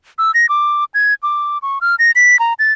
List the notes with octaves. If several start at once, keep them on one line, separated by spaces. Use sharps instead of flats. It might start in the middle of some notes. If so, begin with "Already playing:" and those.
E6
A#6
D6
G#6
D6
C#6
F6
A#6
B6
A#5
A6